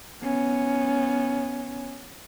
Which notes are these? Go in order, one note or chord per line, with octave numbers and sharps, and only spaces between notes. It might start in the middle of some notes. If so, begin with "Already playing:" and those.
B3 C#4